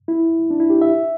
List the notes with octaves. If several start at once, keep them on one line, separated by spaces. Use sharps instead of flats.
E4
D4
E4
G4
E5